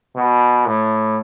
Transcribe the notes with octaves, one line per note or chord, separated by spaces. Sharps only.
B2
A2